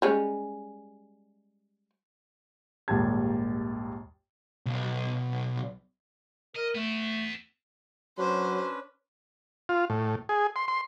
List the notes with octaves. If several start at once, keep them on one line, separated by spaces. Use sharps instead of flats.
G3 G#3 C#4
A#1 D#2 G#2 G3 A5 G#6
B1
A#4 D#5
A3 B3 E4
F#3 C#4 D4 B4 C5
F4
A2
G#4
C6
C6